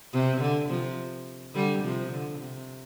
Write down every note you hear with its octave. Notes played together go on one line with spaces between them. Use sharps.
C3
D3
C3 F3
D3 G3
C3 F3
D3
C3